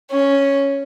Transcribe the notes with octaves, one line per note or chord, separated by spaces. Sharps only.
C#4